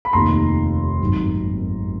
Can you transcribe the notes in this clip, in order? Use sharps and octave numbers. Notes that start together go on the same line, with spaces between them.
B5
F1 D#2 D#3 A#5 C6
G#1 F#2 D#3